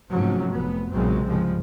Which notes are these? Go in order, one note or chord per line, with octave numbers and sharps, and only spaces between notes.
G#2 C3 F3 F#3 A3 C#4
F1 B3
B1 A#2 C#3 F#3 G#3 C4
C2 G2 C#3 F3 G#3